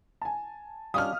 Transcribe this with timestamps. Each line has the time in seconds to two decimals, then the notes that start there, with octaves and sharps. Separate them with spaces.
0.22 G#5 A5
0.94 G3 C#4 D4 D#5 F5 D#6 F6